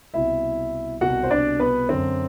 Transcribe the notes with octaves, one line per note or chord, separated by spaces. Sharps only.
C2 B2 E4 E5
C2 B2 F#4 F#5
C5
D4 D5
B3 B4
F#2 D3 C4